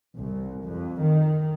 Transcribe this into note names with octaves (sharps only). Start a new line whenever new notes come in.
C2
F2
D#3